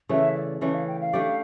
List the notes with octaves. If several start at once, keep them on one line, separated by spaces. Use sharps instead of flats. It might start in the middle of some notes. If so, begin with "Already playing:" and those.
C#3 E3 A3 E5
D5
C#3 E3 A3 D5
F5
G5
F5
A3 D4 G4 D5